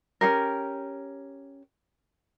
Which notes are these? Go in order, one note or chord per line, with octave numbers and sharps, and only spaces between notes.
C#4 D#4 G4 A#4